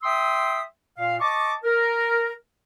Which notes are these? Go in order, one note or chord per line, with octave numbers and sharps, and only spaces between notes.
E5 G5 C6 D#6 E6
A#2 F5
D#5 A5 C#6 D6
A#4